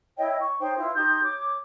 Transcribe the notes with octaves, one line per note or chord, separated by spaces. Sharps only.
E4 C#5 D#5 G5
C#6
D#4 C5 C#5 G5
E4 F4 B4
D#4 G4 C6 G6
C#5 D6